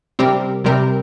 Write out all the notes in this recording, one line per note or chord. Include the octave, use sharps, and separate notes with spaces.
C3 G3 C4 G4 A#4
C3 G3 C4 G4 A#4